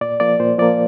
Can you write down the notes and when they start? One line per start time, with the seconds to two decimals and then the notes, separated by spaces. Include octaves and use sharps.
0.01 A#2 D5
0.20 F3 A#3 D5
0.39 A#2 C5
0.58 F3 A#3 D5